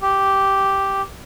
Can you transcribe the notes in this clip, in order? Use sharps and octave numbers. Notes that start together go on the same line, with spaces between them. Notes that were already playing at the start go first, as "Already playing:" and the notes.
G4